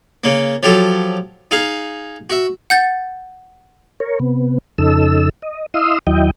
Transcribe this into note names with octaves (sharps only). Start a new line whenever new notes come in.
C#3 A#3
F3 F#3 G4 A4
D#4 G#4 F5
F#4 E5
F#5 G6 A6
A#4 C#5
C3 B3
F2 C#3 D#4 A4 E6
D#5
E4 D#5 F5 C6 D#6 E6
D#2 F#3 E4 D#5 G5